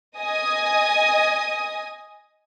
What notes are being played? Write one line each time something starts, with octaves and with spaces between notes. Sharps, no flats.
D#5 G#5 D#6